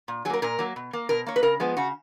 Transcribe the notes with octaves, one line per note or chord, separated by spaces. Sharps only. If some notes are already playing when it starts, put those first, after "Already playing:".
A#2
F#3 A#3 G#4 A#4
A#2 A#4
F#3 A#3
B2
A#3
B2 A#4
A#3 C#5
B4
C#3 A#4
F3 G#3 B3
C#3 F#4